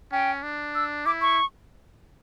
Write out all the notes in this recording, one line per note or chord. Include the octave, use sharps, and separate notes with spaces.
C#4 G5
D4
E6
E4 D6
C#6